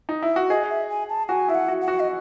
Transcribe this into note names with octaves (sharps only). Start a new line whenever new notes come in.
D#4
E4
F#4
G#4 D#5
E5
G#5
A5
F#4 G#5
E4 E5
F#5
F#4
F#5
F#4
D#5